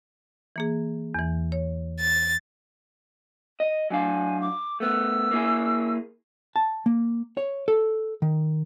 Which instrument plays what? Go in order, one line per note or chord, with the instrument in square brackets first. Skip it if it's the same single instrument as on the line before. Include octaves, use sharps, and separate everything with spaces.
[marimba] E3 A#3 G#4
E2 E3
C#5
[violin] A6
[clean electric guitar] D#5
[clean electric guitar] F#3 D4 F5 [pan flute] G#5
[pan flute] D6
[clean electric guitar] A3 B3 [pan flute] E6
[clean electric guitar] A#3 E4 G#4
[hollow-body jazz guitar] A5
A#3
C#5
A4
D#3